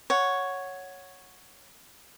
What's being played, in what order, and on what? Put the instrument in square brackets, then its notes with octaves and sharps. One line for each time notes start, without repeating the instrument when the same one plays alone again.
[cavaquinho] C#5 F#5